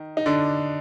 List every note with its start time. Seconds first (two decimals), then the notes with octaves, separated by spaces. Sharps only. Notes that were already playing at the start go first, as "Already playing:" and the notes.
Already playing: D#3
0.17 D#4
0.26 D3 D4